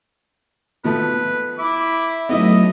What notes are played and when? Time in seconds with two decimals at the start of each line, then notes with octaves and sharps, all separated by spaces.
0.84 B2 F3 A3 B4
1.59 E4 E5 B5 D6
2.29 F#3 A3 B3 D#4 E4 D#5